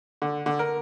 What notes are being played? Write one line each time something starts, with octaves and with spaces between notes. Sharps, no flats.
D3
D3
A#4